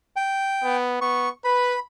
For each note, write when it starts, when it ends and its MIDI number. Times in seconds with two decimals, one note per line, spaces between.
0.16 0.77 79
0.64 0.97 59
1.01 1.29 59
1.01 1.29 85
1.44 1.77 71
1.44 1.80 83